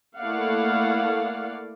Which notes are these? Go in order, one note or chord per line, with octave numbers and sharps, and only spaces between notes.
A3 A#3 E4 D5 F5 F#5